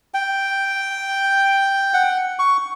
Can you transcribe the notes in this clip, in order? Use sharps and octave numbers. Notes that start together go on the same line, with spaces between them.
G5
F#5
C#6